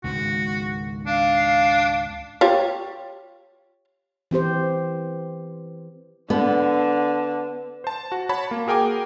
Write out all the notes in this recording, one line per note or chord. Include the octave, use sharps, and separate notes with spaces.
C#2 G#2 D#3 F#4
D4 F5
F4 G4 C#5
E3 C4 G4 C5
D3 B3
C5 A5
F#4
C#5 A5 B5
A#3
F#4 G#4 A#4 G5 G#5 D6